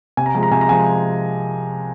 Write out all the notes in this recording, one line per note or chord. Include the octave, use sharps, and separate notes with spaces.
C3 G#5
A#5
F3 G#3 G#5
A#5
C3 G#5
A#5
F3 G#3 G#5